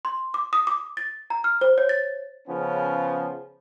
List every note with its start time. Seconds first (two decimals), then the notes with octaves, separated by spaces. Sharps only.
0.05 C6
0.34 D6
0.53 D#6
0.67 D6
0.97 A6
1.30 A#5
1.44 F6
1.61 C5
1.78 C#5
1.89 A6
2.48 C#3 F3 B3 C#4